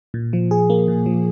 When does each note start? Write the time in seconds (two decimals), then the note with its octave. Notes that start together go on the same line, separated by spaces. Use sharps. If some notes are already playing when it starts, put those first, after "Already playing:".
0.14 A#2
0.33 F3
0.51 G#4
0.70 A#3
0.88 A#2
1.06 F3